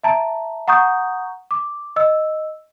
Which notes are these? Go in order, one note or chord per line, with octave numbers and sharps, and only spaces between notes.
E5 A5 A#5
F#5 A#5 C#6 D#6 G6
D6
D#5 E6